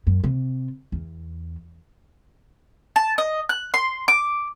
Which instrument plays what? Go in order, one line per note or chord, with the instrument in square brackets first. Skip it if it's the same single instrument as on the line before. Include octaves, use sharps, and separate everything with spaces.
[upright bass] F#2
C3
E2
[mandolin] A5
D#5
F#6
C6
D6